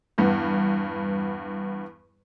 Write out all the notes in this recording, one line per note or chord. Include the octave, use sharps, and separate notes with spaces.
E2 G2 B3